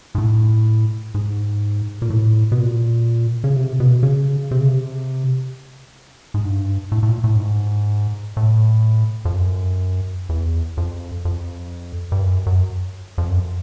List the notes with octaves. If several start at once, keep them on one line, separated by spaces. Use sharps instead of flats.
G#2
A2
G#2
A#2
A2
B2
A#2
C#3
C3
B2
C#3
C3
C#3
C3
G#2
G2
A2
A2
A#2
A2
G2
G#2
A2
F2
F#2
E2
F2
F2
G2
F#2
F#2
F2
F#2